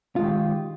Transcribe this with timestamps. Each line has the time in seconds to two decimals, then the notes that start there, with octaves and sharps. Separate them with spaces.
0.16 F4
0.19 G#3
0.21 D#3
0.24 G4